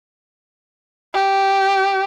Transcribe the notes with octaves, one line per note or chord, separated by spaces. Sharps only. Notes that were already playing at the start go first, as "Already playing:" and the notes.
G4